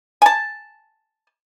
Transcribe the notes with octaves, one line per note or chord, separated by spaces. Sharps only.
G#5 A5